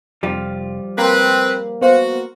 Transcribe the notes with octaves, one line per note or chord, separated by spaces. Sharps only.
F1 F3 G3 F4
A#3 C4 B4
B3 F#4 C5 F5